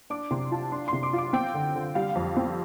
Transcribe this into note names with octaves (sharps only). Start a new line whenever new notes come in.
D4 D6
C3 C6
F4 A5
D4 C6
C6
C3
D6
F4
D6
C4 G5
D3
D3
G3 F5
F2
C4